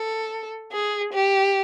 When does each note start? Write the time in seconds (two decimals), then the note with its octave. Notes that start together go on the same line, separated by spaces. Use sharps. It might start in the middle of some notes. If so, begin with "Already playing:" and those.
Already playing: A4
0.72 G#4
1.13 G4